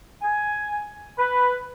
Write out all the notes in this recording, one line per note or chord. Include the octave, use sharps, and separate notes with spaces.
G#5
B4